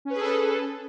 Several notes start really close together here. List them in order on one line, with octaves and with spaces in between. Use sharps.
C#4 B4 G#4 A4